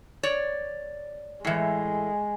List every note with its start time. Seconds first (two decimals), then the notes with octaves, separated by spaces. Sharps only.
0.23 C#5 D5
1.45 A2 E3 G#3